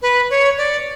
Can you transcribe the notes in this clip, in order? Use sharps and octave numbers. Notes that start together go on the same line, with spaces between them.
B4
C#5
D5